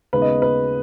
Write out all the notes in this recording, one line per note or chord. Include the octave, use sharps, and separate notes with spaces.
D#2 C#3 G#3 B3 B4
D#5
B4